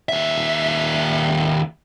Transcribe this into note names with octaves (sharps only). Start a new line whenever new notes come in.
D#2 E5